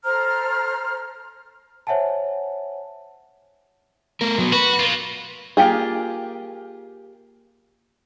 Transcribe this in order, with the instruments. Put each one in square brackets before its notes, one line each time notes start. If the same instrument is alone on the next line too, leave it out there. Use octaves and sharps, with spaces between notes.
[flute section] A4 C5 A#5 F6
[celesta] C5 C#5 E5 F#5 G#5 A5
[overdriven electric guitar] A3 A#4
F#3 B3
[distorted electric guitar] F#4 [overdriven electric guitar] B4
[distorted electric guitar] A#3 F4
[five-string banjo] A#3 F4 G4 G#4